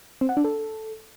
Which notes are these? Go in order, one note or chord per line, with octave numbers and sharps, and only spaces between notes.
C4
F#5
D4
A4